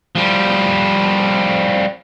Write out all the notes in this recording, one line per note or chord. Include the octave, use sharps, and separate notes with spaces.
F3 G3